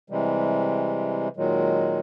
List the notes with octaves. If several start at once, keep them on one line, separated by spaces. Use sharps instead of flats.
C3 E3 G3 G#3
A#2 D#3 F#3 G#3